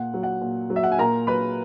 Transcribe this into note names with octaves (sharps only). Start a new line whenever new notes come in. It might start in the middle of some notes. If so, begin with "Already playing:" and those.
Already playing: A#2 F#5
F#3
F#5
A#2
F#3
E5
F#5
G#5
A#2 A#4 A#5
F#3 B4 B5